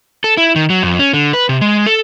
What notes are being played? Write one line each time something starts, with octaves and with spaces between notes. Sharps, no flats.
A4
E4
D#3
F#3
F2
C#4
D3
B4
C3
G#3
A4